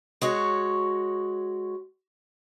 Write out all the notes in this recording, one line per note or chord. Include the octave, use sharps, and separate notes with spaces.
G#3 F#4 C#5